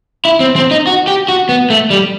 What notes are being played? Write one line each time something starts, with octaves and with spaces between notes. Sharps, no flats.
E4
C4
C4
D#4
F#4
G4
F#4
B3
A3
G3